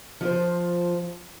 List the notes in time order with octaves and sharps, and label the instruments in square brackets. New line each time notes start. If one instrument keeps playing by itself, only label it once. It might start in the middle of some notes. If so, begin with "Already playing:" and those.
[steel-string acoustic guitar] F3 C5